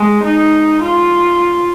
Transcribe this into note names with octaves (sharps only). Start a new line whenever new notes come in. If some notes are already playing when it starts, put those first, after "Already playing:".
Already playing: G#3
D#4
F4